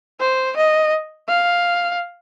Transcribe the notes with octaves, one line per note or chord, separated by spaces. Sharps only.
C5
D#5
F5